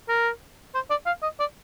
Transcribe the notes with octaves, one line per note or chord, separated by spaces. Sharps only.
A#4
C5
D5
F5
D#5
D5